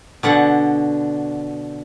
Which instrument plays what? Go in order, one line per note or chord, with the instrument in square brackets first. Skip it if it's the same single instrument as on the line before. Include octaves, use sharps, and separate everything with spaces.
[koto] B2 D3 F#5